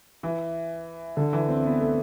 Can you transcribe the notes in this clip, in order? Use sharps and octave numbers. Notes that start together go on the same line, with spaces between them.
E3
D3
E3
C4
B3
A3